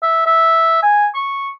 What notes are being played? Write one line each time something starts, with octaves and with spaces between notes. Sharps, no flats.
E5
E5
G#5
C#6